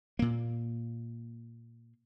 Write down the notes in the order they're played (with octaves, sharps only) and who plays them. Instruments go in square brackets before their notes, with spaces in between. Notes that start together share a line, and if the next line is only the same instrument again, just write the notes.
[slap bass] A#2 A#3